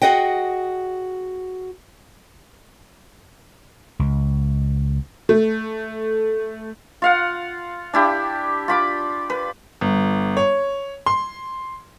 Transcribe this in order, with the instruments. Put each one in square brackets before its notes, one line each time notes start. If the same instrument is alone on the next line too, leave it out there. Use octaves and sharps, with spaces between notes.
[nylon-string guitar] F#4 G#4 D#5 F#5 G5
[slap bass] C#2
[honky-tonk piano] A3
[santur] F4 F5 F#5
D4 E4 G4
F4 B5 D6
B4
[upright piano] G1
C#5
C6